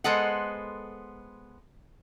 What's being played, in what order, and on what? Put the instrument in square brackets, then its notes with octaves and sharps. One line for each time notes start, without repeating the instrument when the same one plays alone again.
[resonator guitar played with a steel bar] G#3 B3 A4 C5 D#5 F#5